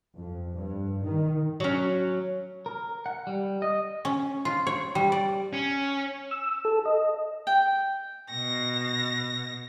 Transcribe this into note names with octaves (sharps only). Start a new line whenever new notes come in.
F2
G2
D#3
F#3 C#4
A#4
F#5
G3
D#5
C#4
F4
C#5
G3
D5
C#4
E6
A4
D#5
G5
B2 A#6